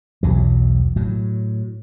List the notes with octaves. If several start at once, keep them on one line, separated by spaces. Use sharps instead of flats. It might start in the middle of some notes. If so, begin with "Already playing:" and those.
B1 E2 F#3
A2 F#3